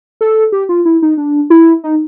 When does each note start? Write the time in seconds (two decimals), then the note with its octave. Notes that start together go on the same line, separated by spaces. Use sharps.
0.21 A4
0.52 G4
0.69 F4
0.85 E4
1.02 D#4
1.18 D4
1.50 E4
1.84 D#4